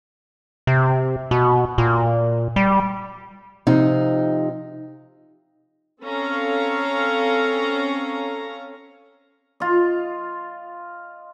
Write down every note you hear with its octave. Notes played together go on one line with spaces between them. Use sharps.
C3
B2
A#2
G3
C3 F3 D#4
C4 C#4 A4 C#5 F5 A#5
F4 D#5